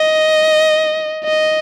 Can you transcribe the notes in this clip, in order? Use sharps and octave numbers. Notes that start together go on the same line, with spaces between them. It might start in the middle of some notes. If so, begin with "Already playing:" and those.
Already playing: D#5
D#5